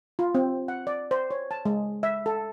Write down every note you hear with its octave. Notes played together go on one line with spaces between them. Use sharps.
F4
C4
F#5
D5
C5
C#5
A5
G#3
E5
A4